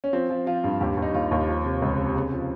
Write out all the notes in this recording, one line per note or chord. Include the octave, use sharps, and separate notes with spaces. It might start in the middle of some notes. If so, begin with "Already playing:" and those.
C#4
F3 C4
F3
F3 F4
G2
D#2 G4
D#2
D#4
D#2 F4
D#2
F3
C3
C#2
C3
C#3
F3